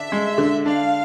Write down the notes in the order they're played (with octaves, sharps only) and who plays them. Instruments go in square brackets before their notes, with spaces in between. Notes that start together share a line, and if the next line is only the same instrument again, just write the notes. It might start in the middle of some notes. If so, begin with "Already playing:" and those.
Already playing: [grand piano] D3 D4 [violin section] E5
[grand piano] G#3
D3
[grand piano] D4 [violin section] F5